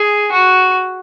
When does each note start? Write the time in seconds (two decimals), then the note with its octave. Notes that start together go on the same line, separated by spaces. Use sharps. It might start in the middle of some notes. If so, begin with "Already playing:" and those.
Already playing: G#4
0.32 F#4